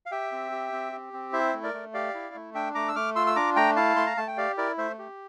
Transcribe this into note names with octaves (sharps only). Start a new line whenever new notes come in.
F5
G4 E5 G5
C4
G4
C4
G4
C4
E4 C5 E5
A3
A#4 D5
A3
G4 D5 F5
E4
A3
D4 E5 G5
A3 A#5 D6
E6
A3 D6 F6
F4 C6 E6
E6
D4 A#5 D6
A3 G5 A#5
E4 F5 A5
A3 C6
A#5
A3 A5
G5
G4 D5 F5
E4 A#4 D5
A3 C5 E5
G4